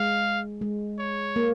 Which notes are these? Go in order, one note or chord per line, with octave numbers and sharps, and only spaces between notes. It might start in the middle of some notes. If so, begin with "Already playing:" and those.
Already playing: G#3 F5
G#3
C#5
A#3